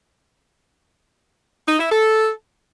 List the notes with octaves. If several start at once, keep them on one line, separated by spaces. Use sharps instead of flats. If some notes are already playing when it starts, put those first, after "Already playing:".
D#4
E4
A4